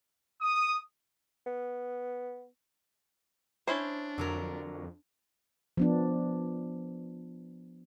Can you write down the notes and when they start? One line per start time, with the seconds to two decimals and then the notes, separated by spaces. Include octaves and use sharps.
0.41 D#6
1.46 B3
3.68 C#4 D4 E4 C5
4.18 F2 D3 F#3 A#4
5.77 F3 B3 D4